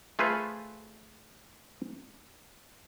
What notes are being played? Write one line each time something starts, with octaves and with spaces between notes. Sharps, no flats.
A3 F4 G#4 A4 B4 C5